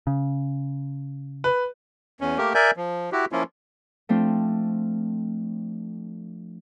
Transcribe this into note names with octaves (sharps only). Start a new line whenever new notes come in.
C#3
B4
E2 C#4
A3 A#3 G4 A#4
A#4 D5 E5 G#5 G6
F3
E4 F#4 G4
F3 A#3 C#4 E4 F4
F3 A3 C4 D4 F4